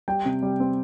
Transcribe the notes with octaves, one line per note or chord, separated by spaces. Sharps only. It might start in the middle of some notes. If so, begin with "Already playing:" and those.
G3 G5
C3
G3
C4